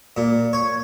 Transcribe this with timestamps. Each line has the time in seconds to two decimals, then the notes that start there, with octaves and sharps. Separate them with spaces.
0.17 A#2
0.53 C#5